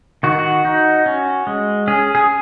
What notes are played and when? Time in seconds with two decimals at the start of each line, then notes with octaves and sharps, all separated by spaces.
0.23 D#3 F#4
0.39 F#4
0.65 D#4
1.06 C#4
1.47 G#3
1.88 C#4 G#4
2.15 G#4